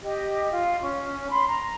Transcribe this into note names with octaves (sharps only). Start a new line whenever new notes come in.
G4 D#5
F4
C#4
B5 C6
A#5